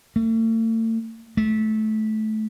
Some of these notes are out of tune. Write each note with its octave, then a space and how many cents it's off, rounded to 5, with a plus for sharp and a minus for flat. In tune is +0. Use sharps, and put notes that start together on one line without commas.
A3 +40
A3 -20